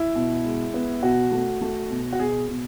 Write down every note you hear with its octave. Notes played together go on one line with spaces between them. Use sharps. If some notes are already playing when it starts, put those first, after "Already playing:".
Already playing: E4
B2
G#3
B3
B2 F#4
A3
A3
B2
F#4
B2 G#4
B2